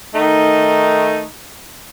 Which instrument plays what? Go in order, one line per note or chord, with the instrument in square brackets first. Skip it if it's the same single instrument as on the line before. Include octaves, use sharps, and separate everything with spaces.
[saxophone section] D#3 A3 D#4